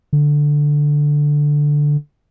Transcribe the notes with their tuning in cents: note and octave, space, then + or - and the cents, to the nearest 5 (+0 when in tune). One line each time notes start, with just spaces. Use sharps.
D3 +0